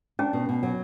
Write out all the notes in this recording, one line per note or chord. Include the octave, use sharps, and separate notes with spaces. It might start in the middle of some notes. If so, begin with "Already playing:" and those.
C#4 D4
B2
B2
F#3